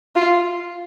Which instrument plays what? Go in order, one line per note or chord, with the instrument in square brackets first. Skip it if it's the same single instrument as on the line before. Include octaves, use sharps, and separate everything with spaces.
[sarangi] F4